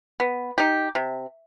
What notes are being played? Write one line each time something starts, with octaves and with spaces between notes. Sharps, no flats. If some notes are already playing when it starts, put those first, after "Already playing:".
B3
D#4 G4
C3